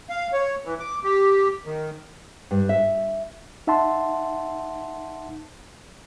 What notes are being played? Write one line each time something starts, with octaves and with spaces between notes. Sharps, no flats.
F5
C#5
E3
D6
G4
D#3
G2
E5
D#4 E5 F#5 A5 C6